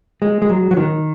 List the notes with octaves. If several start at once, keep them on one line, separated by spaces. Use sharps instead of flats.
G#3
G#3
F#3
F#3
D#3